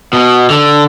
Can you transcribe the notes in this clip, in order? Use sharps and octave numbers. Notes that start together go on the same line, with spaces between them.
B2
D3